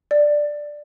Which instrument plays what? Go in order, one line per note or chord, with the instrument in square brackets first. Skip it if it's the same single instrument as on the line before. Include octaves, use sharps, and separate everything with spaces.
[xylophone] D5